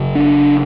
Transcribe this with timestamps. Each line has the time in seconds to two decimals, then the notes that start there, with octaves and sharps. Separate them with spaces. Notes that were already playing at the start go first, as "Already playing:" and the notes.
Already playing: F#1 F#2 C#3
0.15 D4